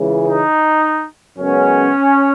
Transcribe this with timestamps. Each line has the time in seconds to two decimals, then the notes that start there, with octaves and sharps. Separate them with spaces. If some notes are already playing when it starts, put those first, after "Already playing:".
Already playing: C#2 C#3 E3
0.27 D#4
1.38 F#2 C#3 G#3 B3 C#4